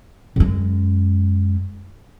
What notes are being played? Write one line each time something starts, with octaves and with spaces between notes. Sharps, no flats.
F#2 G#3